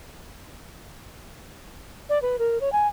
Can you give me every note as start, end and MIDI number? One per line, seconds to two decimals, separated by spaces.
2.09 2.21 74
2.22 2.36 71
2.39 2.60 70
2.61 2.72 73
2.72 2.87 80